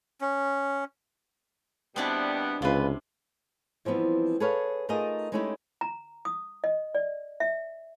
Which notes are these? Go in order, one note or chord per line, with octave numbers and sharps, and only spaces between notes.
C#4
B2 G3 B3 C4 D4 E4
C#2 C3 F4 B4
E3 F3 G3 B3 C4
G#4 A4 B4 C#5 F5
A3 D#4 F4 G#4 A#4 D#5
G#3 A3 C#4 D#4 E4 G4
A#5
D#6
D#5
D5
E5